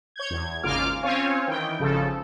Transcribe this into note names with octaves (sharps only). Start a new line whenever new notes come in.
C#5 G6 G#6
E2 G#6
G#1 C#3 A#3 F4 D6 F6
C4 C#4 F4 C#5 F5 G#5
D#3 E3 G5
G#1 C#3 F3 A4